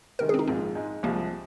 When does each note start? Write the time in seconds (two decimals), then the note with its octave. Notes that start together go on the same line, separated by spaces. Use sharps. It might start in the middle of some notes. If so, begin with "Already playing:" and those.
0.19 C3 D#3 G#3 A#4
0.29 G#4
0.34 C4
0.39 D#4
0.48 A#1 G#2 G#3 C4 F4
0.75 G#2 G#3 D#4
1.03 C2 C3 F3 G#3 A#3